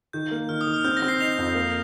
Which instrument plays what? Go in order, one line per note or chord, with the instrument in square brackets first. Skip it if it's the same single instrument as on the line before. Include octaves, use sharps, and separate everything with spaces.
[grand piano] D#3 [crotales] G6
[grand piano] A#3
[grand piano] D#3 [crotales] F6
[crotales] D#6
[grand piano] D#3
[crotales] F6
[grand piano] C4 [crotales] G6
[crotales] A#6
[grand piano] C4
[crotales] C7
[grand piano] D#4 [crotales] C7 F7
[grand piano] F2
A#3